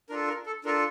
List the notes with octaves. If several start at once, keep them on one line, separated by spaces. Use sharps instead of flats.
D4 F4 A4 A#4
A#4
A4
D4 F4 A4 A#4